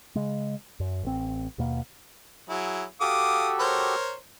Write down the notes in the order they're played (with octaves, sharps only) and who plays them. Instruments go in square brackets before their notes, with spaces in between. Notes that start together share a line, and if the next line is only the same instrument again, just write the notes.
[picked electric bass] C#3 G#3
F#2
A1 C4
D#2 B2 A#3
[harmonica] F#3 E4 G#4
[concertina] F#4 G4 A4 [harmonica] F5 D6 D#6
[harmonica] A#4 C5 C#5